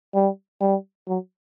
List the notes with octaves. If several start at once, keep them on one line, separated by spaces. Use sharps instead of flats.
G3
G3
F#3